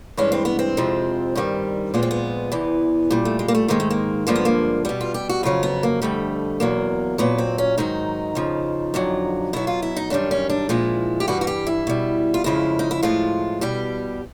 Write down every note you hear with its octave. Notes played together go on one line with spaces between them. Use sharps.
G2 E3 G#3 C#4
C4
B3
C4
F2 C3 F3 G#3
G2 D#3 G3
A#2 F3 G#3 B3
C4
B3
E2 C3 E3
A#2 G3
A3
G#3
A#3
A3
G#2 D#3 G#3 A#3
A3
A#3
G2 D3 F3 G#3 A#3
B3
A#3
B2 G3 B3
F4
G4
F#4
F2 C#3 F#3 F4
B3
A#3
F2 D3 G3 A3
E2 B2 F#3 A#3
A#2 F#3 B3
C4
C#4
G#2 D#3 F#3 D#4
F2 C#3 F3
F2 D3 F#3
B2 F#3 E4
F4
E4
D#4
F#2 D#3 G3 D4
C#4
D4
A#2 F3 G#3 E4
G4
G2 E3 G3 F#4
F#4
G4
E4
B2 G3
F4
F2 C#3 F3 G#3 E4
D#4
E4
A2 F3 G#3 F4
B2 G3 G4